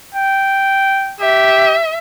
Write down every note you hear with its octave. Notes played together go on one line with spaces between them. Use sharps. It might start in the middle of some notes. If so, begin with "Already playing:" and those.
G5
G4 E5